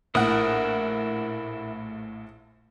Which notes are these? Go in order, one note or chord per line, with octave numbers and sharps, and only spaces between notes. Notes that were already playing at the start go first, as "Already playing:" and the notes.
A#1 A2 E4 A#4 F#5 D#6